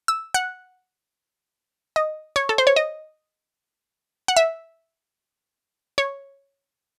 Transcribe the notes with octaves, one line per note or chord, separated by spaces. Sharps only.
E6
F#5
D#5
C#5
A4
C5
C#5
D#5
F#5
E5
C#5